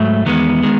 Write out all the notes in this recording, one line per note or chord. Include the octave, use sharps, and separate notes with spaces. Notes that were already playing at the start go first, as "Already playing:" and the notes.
Already playing: G#2 F#3 A3
E2 D#3 G#3 B3
D#3 G#3